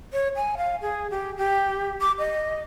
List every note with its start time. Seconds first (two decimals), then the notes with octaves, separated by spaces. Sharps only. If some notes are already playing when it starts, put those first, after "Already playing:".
0.13 C#5
0.36 G#5
0.57 F5
0.82 G#4
1.10 G4
1.37 G4
2.01 D6
2.19 D#5